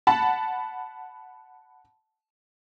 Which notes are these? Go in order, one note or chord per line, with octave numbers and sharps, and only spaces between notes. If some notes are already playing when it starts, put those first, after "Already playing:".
F#5 A5 B5